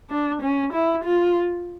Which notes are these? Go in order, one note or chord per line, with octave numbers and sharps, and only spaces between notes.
D4
C#4
E4
F4